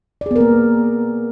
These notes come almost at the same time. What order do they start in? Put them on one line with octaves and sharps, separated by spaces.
D5 G#4 B3 A#4 A#3